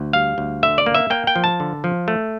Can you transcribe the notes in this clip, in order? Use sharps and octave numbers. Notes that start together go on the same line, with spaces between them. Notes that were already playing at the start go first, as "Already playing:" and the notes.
Already playing: D2
G3 F5
D2
D3 E5
D5
A#3
E5
A#3 G5
G5
F3
A5
D3
F3
A3